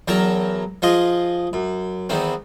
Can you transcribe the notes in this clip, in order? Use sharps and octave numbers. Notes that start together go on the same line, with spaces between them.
E2 F#3 A#4 G5 A5 A#5
F3 F4 G#4 D#5 C6
F#2
E2 D#3 B3 C4